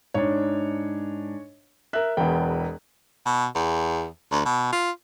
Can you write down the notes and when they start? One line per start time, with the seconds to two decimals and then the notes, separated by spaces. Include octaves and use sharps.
0.14 G#2 D4 C#5
1.93 A#4 E5 F#6
2.17 E1 E2 B4 G5
3.26 B2
3.55 E2
4.31 D2
4.45 B2
4.73 F4